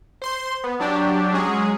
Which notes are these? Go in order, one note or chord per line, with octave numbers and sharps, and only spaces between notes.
C5 C6
B3
F#3 D4 G4
F#3 G#3 C#4 G#4